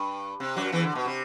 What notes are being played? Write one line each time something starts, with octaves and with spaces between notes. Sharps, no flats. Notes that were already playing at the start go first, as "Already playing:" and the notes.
Already playing: G2
C3
F#2 F#3
E2 E3
D3
B2
C3